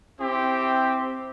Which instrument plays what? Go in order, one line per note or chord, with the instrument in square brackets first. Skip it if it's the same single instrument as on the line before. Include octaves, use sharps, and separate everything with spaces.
[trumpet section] C4 E4 G4